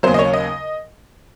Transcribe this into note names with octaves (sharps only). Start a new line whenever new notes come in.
D#2 C#3 F#3 C5
D#5
C#5
D#5